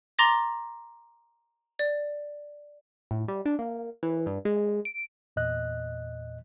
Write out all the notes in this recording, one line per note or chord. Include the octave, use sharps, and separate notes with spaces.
A#5 C6 D6 A6 A#6
D5
A2
G3
D4
A#3
E3
G2
G#3
D7
E2 A#2 D#5 F#6